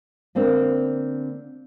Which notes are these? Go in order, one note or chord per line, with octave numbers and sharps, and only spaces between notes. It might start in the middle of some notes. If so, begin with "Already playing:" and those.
D3 A#3 C4 D4